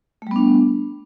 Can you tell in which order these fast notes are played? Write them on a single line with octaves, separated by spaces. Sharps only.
A3 G3 B3 D4